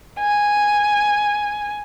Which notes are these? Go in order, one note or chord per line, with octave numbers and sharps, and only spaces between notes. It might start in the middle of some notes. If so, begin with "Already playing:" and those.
G#5